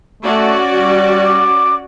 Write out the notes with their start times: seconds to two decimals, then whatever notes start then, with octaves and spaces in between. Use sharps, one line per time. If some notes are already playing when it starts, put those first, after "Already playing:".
0.23 A3 C#4 F#4 D5
0.74 G3
1.24 D6